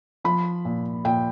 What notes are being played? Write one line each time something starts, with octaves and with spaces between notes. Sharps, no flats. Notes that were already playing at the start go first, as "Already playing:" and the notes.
F3 B5
A#2
A#2 G5